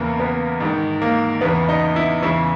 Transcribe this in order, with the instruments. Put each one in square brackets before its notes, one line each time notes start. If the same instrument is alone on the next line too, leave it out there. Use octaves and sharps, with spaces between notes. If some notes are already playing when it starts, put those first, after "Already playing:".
Already playing: [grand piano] E2 C#3 E3 A#3
B3
G#2 D#3
A#3
E2 C#3 E3 B3
D#4
E4
E2 C#3 E3 E4